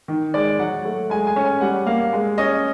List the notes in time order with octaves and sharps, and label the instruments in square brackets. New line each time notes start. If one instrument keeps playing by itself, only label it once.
[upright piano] D#3
G#3 D5
F#3 F#5
A3
G#3 G#5
G#5
C#4
G#5
G3 F#5
A#3 F5
G#3
C#4 D#5